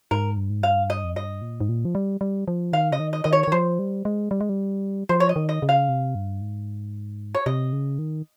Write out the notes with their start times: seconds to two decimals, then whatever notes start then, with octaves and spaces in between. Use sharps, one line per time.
0.11 G#2 A#4
0.37 G2
0.50 G#2
0.62 G2 F5
0.90 D#5
1.04 F2
1.15 G2 D#5
1.42 A#2
1.61 G#2
1.69 A#2
1.85 F3
1.95 G3
2.21 G3
2.48 F3
2.73 D#3 F5
2.92 C#3 D#5
2.99 D#3
3.13 D#5
3.24 D#3 D#5
3.33 C#5
3.43 C#5
3.48 D#3
3.52 F3 C5
3.79 G3
4.05 G#3
4.31 G3
4.41 G#3
4.49 G3
5.09 F3 C5
5.20 C#5
5.29 D#5
5.36 D#3
5.49 D#5
5.62 C#3
5.69 F5
5.89 C3
6.15 G2
6.41 G#2
7.35 C#5
7.46 C3 D#5
7.73 C#3
7.99 D#3